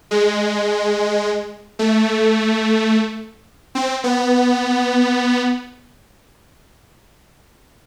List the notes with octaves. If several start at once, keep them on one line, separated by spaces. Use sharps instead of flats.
G#3
A3
C4
B3